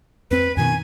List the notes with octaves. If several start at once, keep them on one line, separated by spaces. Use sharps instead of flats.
F2 C4 B4
F#2 B2 D#3 G#5